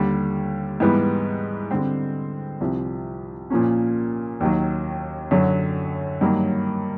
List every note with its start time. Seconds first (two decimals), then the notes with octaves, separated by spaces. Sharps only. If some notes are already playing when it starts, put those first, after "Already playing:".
Already playing: D#2 D3 G3
0.80 G#2 E3 G3 B3
1.71 D3 G3 C4
2.61 C2 C3 F3
3.50 A#2 F3 A#3 C#4
4.40 D#2 D#3 F#3
5.31 F#2 D3 F#3
6.21 G2 D#3 F#3 A#3